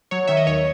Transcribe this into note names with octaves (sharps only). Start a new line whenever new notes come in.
F#3 C#5
D#3 E5
D#5
D#2 C#5